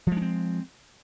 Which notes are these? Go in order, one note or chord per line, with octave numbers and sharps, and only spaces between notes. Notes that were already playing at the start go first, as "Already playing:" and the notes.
F3 G#3 C4 D4